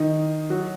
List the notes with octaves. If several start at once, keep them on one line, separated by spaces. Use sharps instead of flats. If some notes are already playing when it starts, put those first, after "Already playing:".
Already playing: D#3 D#4
F#3 F#4